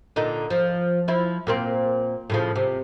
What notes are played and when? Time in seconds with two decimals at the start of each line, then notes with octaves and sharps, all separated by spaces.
0.16 A#2 D3 D#4
0.50 F3
1.08 F3 E4
1.47 A#2 A#3 C4
2.30 A2 C#3 F3
2.56 C3